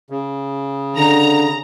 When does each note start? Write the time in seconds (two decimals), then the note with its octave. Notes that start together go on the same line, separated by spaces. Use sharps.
0.10 C#3
0.97 D3 A#5